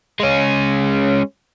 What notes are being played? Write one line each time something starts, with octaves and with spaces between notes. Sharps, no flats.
G#3 C#4